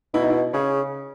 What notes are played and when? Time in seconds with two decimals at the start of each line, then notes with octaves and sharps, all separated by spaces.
0.14 B2 E4
0.22 D#4
0.30 E4
0.53 C#3 G#4